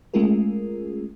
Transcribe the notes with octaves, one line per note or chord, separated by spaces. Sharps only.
G#3 A3 C#4 F4 G#4 A#4